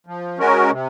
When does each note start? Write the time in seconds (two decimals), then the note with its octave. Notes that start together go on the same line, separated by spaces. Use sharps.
0.07 F3
0.39 G#3 C#4 F#4 A#4
0.71 C3